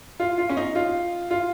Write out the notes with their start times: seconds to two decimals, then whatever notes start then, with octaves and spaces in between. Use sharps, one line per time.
0.20 F4
0.38 F4
0.49 C#4
0.57 D#4
0.75 F4
1.31 F4